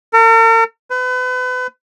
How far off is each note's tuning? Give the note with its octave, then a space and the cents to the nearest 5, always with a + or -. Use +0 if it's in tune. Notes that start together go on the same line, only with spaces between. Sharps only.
A#4 -45
B4 +35